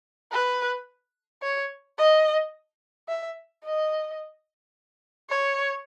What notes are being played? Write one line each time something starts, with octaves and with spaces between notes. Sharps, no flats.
B4
C#5
D#5
E5
D#5
C#5